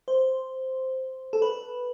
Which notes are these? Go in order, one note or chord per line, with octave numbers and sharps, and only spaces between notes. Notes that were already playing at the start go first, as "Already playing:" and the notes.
C5
A4
B4